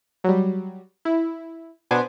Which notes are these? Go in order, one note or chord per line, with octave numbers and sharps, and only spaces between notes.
F#3 G3
E4
B2 B3 D4 C5 G#5 D6